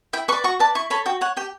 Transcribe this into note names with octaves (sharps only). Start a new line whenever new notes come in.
E4 G5
B4 D5 C#6
F#4 C#6
B4 D5 A5
E4 C#6
A4 C#5 B5
F#4 G5
C#5 F#5
G4 G5